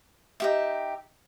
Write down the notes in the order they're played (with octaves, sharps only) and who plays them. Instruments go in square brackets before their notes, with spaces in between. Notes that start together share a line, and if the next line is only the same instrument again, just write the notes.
[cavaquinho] D#4 G4 E5